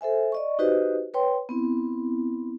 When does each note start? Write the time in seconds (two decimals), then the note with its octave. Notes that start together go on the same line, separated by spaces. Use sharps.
0.01 A4 C5 E5 G#5
0.32 D5 D#5 C#6
0.59 D#4 F#4 G4 B4 C5 D#5
1.14 B4 C#5 G5 C6
1.49 B3 C4 E4